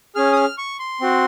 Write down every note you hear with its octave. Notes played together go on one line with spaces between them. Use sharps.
C#4 G#4 F6
D#6
F6
C#6
C6
C4 F#4